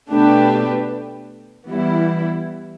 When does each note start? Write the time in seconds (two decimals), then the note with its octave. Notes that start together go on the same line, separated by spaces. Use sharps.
0.11 B2 A3 D4 G4 B4
1.68 E3 G3 B3 E4